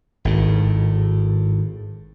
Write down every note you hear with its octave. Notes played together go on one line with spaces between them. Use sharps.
G#1 A2